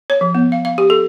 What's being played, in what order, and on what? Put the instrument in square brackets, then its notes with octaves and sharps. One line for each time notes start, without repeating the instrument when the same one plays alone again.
[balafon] C#5
F3
B3
F5
F5
G4
A4